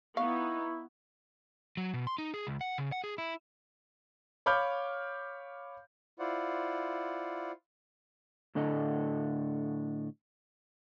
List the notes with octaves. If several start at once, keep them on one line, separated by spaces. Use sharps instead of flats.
B3 D#4 E4 F5 C#6
F#3
B2
C6
D#4
G#4
C#2
F#5
C#3
F#5
G#4
E4
C#5 F5 B5 D6 F6 G6
E4 F4 C5 D5 F#5
A2 D3 D4 A4 D#5